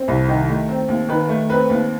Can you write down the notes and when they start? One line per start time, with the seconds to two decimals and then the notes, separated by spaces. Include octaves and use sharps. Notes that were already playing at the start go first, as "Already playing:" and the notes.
Already playing: C4
0.08 C2
0.28 D#3
0.49 A3
0.69 C4
0.88 D#2
1.09 D#3 B4
1.29 A3
1.49 C4 B4
1.70 D#2